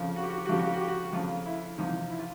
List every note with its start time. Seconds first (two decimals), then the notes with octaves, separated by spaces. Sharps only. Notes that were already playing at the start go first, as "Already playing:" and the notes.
Already playing: F2 C#3 F3
0.16 F#4
0.23 G4
0.30 F#4
0.38 G4
0.45 F#4
0.49 F2 C#3 F3 G4
0.59 F#4
0.66 G4
0.73 F#4
0.81 G4
0.88 F#4
1.03 F#4
1.13 F2 C#3 F3 F4
1.46 E4
1.78 E2 C3 F3 D#4
2.10 E4
2.19 F4